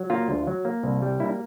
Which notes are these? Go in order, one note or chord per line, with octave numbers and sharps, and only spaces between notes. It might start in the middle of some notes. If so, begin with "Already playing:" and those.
Already playing: F#3
A#3 F4
D2
F#3
A#3
C2
G3
A#3 E4